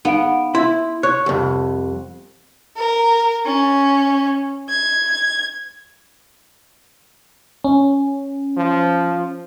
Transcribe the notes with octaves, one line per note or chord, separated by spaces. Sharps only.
B3 D#4 F5 D7
E4 C6
C#5 F#6
C2 F2
A#4
C#4
G#6
C#4
F3